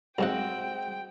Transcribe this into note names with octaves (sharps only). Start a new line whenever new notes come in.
B1 G#2 G#3 C4 F#4 F#5 G5